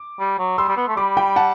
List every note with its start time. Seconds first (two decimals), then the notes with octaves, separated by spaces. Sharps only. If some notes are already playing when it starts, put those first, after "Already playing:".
Already playing: D6
0.20 G3
0.39 F#3
0.58 G3 C6 E6
0.69 G3
0.77 B3
0.88 A3
0.97 G3 B5 D6
1.17 G5 B5
1.36 F#5 A5